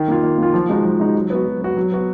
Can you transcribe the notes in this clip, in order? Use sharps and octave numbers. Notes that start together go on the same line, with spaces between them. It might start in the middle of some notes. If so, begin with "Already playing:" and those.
Already playing: D#3
A#3 F4
D#3
A#3 F4
F3
G#3 D#4 F#4
F3
G#3 D#4 F#4
F#3
B3 F#4
F#3
B3 F#4
F#3
B3 F#4